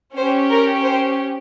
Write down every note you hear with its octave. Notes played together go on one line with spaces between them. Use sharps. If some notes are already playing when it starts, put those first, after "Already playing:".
C#4 G4 C5
A#4
C5